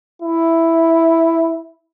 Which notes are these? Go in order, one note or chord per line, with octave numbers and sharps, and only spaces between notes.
E4